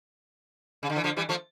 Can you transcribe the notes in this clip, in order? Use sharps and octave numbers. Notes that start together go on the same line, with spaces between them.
C#3
D3
E3
D3 F3
E3 G3
F3 A3